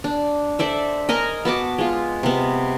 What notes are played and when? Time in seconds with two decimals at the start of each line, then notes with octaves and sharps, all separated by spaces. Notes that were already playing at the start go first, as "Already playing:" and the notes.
0.04 D4
0.59 A4 C5 D5 E5
1.09 A#4 D#5 G#5 A#5
1.45 B3 F#4 A5 D6
1.78 G#3 F4
2.23 C3 B3